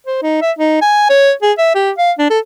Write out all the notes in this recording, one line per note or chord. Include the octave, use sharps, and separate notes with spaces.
C5
D#4
E5
D#4
G#5
C#5
G#4
E5
G4
F5
D4
A4